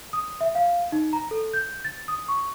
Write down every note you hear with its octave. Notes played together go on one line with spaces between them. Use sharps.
D#6
E5
F5
D#4
A#5
A4
G6
A6
D#6
C#6